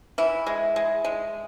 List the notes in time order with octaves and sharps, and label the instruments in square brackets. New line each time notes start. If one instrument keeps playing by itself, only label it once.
[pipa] E3 E4
G#3
G#3
G#3